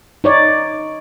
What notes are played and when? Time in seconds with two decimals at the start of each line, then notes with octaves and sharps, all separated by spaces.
0.24 D#4 C#5 D5